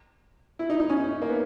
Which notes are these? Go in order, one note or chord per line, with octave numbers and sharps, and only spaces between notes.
E4
D#4
D#4
C#4
A#3
B3